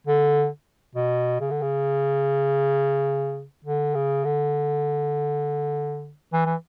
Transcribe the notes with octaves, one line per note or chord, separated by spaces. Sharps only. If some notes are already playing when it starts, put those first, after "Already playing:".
D3
B2
C#3
D3
C#3
D3
C#3
D3
E3
E3